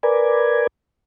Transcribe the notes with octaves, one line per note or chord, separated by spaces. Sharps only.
A#4 B4 D5 G#5